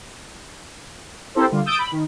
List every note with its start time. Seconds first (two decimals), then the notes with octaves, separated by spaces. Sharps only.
1.35 C4 E4 G4 A4 A#4 C5
1.52 D3 G3 F4
1.65 D#6 E6 G6 A6 D7
1.79 B5
1.92 D#3